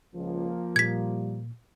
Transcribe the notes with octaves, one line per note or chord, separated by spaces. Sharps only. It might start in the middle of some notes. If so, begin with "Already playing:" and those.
C#2 F3 A#3
A#2 G3 G#6 B6